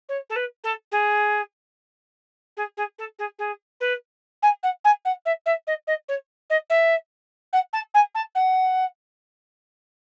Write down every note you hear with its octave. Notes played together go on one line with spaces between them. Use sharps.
C#5
A4
B4
A4
G#4
G#4
G#4
A4
G#4
G#4
B4
G#5
F#5
G#5
F#5
E5
E5
D#5
D#5
C#5
D#5
E5
F#5
A5
G#5
A5
F#5